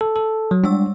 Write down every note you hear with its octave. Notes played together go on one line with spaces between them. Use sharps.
A4
A4
F#3
G3 G#3 D4 E6